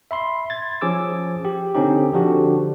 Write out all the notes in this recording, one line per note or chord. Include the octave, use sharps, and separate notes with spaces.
E5 B5 C6
G#6 A6
F3 C#4 G#4 D6 E6
G4
D3 C4 C#4 D#4 G4
D3 F3 D4 F#4 G4